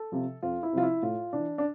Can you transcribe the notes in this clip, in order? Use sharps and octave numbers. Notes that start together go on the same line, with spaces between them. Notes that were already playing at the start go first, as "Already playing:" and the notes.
Already playing: A4
C3 F3
F2 F4
E4
C3 F3 F4
E4
A2 F4
E3 D4
D4